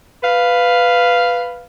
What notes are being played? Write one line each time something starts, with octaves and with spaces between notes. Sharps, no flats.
B4 F5